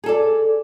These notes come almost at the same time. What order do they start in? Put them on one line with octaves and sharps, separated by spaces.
G#4 A4 D5